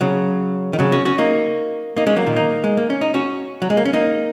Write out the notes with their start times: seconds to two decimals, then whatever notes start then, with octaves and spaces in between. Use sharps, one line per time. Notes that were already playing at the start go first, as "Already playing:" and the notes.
0.01 C#3 F#3
0.73 D#3
0.79 C#3 F#3
0.92 C#4 F#4
1.05 C#4 F#4
1.18 A#3 D#4
1.97 A#3 D#4
2.07 G#3 C#4
2.16 F#3 A#3
2.26 A#2 D#3
2.36 A#3 D#4
2.64 G#3
2.77 A#3
2.90 C#4
3.01 D#4
3.14 C#4 F#4
3.62 F#3
3.70 G#3
3.77 A#3
3.85 C#4
3.93 A#3 D#4